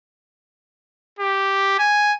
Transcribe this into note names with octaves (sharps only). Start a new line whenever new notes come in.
G4
G#5